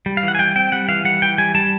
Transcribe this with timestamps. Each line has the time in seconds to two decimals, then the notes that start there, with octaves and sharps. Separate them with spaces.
0.06 G3
0.17 F5
0.23 E3
0.28 F#5
0.35 G#5
0.39 G3 G5
0.56 C4 G5
0.72 G3 F#5
0.89 E3 F5
1.05 G3 F#5
1.22 E3 G5
1.38 G3 G#5
1.55 G3 A5